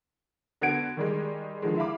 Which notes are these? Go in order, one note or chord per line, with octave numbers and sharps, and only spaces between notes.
D3 B3 F#4 G#6 D7
D#3 G3 G#3
D3 D#3 F3 G#3
E4 E5 F5 B5 D6